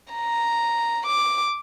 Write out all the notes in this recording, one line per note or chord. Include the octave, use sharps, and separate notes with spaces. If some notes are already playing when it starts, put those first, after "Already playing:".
A#5
D6